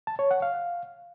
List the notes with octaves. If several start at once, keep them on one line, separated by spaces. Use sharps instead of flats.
A5
C#5
F#5
F5